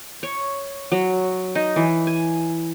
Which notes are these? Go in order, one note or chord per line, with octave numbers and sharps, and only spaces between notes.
C#5
F#3
D#4
E3
G#5